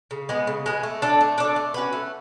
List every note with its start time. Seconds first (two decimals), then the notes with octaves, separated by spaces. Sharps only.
0.11 C#3
0.29 G#3 B3
0.47 C#3
0.66 G#3 B3
0.83 A3
1.02 D4 A4 D5
1.21 A3
1.38 D4 A4 D5
1.56 A3
1.74 C#4 F#4 B4
1.93 A3